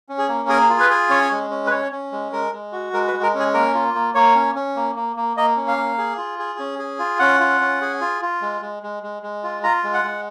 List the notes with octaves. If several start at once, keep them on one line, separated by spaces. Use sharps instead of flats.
C#4
G#4
A#3
G#4 A#4
F4
B4
G#4
C#4 C#5
G#3
C#4
B4
C#4 C#5
C#4
G#3
G#3 A#4
G#3
F#4
G#3 A#4
B4
G#3
A#4
C#4
G#4
A#3 A#4
F4
A#3
A#3 C#5
C#4
C#4
A#3
A#3
A#3
A#3 D#5
C#4
F5
A#3
G#4
F4
G#4
C#4
G#4
F4
C#4 F#5
F4
C#4
G#4
F4
F4
G#3
G#3
G#3
G#3
G#3
F4
F4 A#5
G#3
F#5
G#3